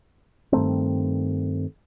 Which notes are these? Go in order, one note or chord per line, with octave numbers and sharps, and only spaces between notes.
G2 D#3 A3 C4